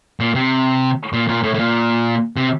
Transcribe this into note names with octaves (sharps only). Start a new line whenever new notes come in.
A#2
C3
A#2
A#2
A2
A2
A#2
C3